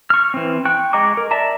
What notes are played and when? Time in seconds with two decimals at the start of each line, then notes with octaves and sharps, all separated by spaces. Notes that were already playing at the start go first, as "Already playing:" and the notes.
0.10 C#6 F6
0.34 E3 C4
0.65 G5 C#6 F#6
0.93 G#3 D#5 A#5 C#6 D6
1.17 A#4
1.31 D5 E5 A5 A#5